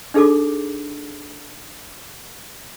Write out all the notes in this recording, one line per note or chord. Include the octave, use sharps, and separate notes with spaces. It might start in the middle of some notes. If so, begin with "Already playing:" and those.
D4 D#4 G#4 A4 D6